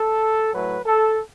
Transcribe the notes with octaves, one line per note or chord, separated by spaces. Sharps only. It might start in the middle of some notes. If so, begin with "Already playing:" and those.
Already playing: A4
A2 F#3 A3 B4
A4